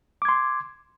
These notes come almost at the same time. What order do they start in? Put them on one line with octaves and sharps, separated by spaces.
D6 G#6 C6